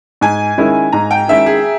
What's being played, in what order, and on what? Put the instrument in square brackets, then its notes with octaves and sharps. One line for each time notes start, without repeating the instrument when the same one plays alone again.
[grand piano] G#2 [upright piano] G#5
[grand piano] D#3 G#3 C#4 E4
[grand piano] G#2 [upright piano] A#5
[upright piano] G5
[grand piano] D#3 G#3 C#4 E4 [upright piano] E5
[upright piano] G#4